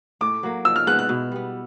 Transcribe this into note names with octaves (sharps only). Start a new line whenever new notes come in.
A2 D6
F#3 A#3
F3 E6
F6
G#3 B3 E4 F#6
F#6
B2
G3 B3